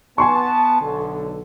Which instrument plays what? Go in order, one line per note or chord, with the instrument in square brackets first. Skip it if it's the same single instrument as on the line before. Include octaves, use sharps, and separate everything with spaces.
[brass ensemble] B3 A5 [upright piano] G#5 C6 C#6
[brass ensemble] B1 D3 A4